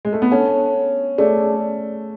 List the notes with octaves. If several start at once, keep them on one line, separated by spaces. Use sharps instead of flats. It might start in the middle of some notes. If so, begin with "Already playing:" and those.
G#3
A3
B3
C#4 D4 A4 C#5 F#5 A5
A3 C#4 G#4 D5 A5